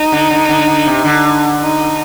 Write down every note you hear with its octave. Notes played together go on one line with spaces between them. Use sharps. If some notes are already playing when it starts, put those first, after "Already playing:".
Already playing: D#4
D3
D3
D3
D3
C3
D3
D#4